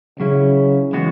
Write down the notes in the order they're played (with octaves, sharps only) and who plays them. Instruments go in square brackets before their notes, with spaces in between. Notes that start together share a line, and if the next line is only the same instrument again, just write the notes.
[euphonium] C#3 [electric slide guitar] F#3 C#4 E4
[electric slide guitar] E3 G#3 B3 F#4